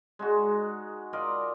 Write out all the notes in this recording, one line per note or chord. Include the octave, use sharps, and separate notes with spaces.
G#3 D#4 F#4
F4 A#4 D5 D#5